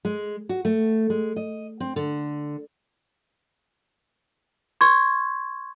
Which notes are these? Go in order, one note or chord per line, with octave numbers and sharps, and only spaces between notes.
G#3
F#4
A3
G#3
D#5
C4
D3
C6 C#6 G#6